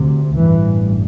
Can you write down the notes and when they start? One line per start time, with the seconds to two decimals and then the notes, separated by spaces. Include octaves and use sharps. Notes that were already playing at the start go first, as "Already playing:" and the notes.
Already playing: D2 C3
0.36 A1 G2 E3